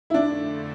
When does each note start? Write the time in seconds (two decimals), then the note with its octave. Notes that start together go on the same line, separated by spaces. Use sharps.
0.10 E4
0.14 F2 D3 A3 D4